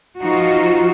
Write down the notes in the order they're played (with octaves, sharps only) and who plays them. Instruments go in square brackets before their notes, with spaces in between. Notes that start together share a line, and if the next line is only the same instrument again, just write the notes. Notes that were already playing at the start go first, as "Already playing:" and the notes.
[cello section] F3 D#4 F4 F#4